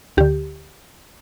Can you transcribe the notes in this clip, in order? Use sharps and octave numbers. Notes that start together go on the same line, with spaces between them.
D2 D3 G4